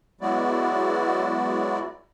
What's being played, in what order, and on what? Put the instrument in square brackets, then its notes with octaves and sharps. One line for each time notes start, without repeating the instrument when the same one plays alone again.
[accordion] F#3 G#3 B3 E4 F#4 D5